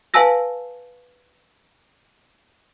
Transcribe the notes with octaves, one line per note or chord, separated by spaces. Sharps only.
B4 F5 G#5 A5 E6 A#6